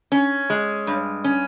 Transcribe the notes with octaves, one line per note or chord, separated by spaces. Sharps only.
C#4
G#3
G2
C#4